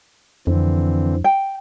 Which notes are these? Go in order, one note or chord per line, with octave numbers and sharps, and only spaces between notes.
F2 D3 E3 C4
G5